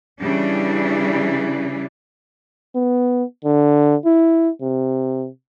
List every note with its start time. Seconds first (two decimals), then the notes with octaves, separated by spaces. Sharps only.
0.22 C#3 E3 G3 D4
2.75 B3
3.45 D3
4.05 E4
4.62 C3